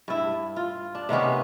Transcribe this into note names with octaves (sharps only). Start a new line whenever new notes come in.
G2 E4
F4
D4
C3 D#3 B3 C#4